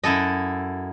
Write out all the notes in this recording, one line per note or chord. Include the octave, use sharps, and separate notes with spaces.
F#2 E4 A4 D#5